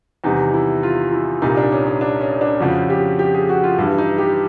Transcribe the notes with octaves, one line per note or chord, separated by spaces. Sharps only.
E2 C3 D#3 G3 D#4
E4
F4
E4
C2 A#2 G3 D#4
D4
C#4
C#4
D4
C#4
D4
F2 C#3 F3 F#4
G4
G4
G#4
F#4
F4
G2 E3 G3 E4
D#4
G4